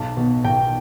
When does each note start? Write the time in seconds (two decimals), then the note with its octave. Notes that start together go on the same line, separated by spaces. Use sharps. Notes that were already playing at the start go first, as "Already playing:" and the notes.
Already playing: B1
0.17 B2
0.44 B1 G5